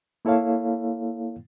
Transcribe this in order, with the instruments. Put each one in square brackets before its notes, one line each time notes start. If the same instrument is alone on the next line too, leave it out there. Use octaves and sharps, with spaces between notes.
[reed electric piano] A#3 E4 A4 C#5 F5